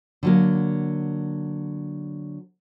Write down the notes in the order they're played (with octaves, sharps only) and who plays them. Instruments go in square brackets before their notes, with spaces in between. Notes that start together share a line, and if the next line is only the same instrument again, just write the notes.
[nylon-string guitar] D3 F#3 A#3